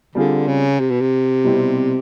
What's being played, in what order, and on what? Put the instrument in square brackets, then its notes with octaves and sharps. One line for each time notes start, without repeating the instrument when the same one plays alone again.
[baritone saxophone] D3 [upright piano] G3 C4 F4 G#4
[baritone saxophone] C#3
C3
B2
C3
[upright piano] B2 G3 C4 E4 G4